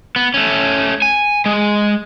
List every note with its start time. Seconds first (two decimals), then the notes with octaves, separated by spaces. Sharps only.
0.16 B3
0.34 A3 C#4
1.02 G#5
1.46 G#3